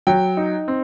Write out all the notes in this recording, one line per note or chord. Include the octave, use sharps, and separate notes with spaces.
F#3 G5
D#4
C4